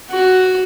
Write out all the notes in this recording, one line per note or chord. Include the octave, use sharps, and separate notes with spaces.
F#4